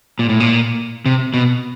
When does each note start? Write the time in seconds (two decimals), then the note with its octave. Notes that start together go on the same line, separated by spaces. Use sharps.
0.19 A#2
0.29 A2
0.40 A#2
1.06 C3
1.34 B2